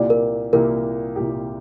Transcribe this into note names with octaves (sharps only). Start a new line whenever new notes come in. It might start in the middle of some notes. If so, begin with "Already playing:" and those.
Already playing: C2 A#2 A#3 G4 D5
A#4
C2 A#2 A#3 G4 A#4
C2 A#2 A#3 G4